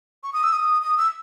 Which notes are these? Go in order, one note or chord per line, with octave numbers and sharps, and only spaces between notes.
C#6
D#6
E6
D#6
D#6
E6